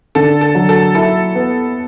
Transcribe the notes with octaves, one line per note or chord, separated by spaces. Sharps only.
D3 A4
A4
F#3
A4
E4 A4
B3